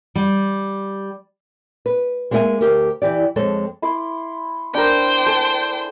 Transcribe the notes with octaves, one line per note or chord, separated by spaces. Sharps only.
G3
B4
G#3 A#3 C#4 G4 E5 G#5
D2 G4 A#4
E3 G4 D5
F2 G#3 A4 C#5
E4 C6 D6
D4 A#4 C5 G5
A4 G#5 A5